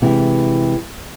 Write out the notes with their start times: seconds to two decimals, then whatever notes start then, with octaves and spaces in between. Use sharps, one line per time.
0.02 C3 E3 G#3